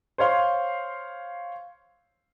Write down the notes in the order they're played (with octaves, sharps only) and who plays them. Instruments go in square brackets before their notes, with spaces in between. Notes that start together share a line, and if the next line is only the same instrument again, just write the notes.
[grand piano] C5 C#5 F5 C6